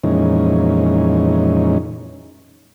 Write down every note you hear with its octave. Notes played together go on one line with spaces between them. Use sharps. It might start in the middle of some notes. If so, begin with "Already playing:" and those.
F2 A#2 E3 G#3 C#4 D#4